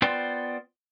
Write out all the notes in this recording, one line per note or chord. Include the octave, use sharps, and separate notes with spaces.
B3 F4 B4 C5 D5 G5